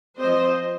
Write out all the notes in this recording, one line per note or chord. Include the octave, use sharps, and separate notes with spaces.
F3 C4 C5 D#5